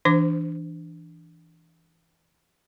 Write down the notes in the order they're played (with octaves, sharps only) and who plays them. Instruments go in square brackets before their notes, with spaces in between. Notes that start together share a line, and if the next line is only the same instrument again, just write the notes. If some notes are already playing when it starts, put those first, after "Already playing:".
[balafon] E3 D4 C5 D6